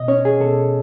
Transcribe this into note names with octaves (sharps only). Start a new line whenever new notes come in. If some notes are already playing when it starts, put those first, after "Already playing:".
Already playing: B2 D#5
C#4 C#5
G#4
B2 A4